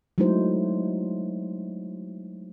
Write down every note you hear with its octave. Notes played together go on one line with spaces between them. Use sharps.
F#3 G#3 A3 D#4 E4 C5